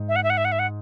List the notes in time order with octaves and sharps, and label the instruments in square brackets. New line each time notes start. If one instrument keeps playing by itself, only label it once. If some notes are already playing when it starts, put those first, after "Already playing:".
Already playing: [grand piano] G#2
[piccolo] E5
F#5
E5
F#5
E5
F#5
E5
F#5